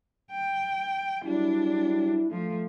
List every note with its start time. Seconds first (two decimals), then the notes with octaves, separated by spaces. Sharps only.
0.31 G5
1.25 F#3 G3 D4 E4
2.31 F3 A3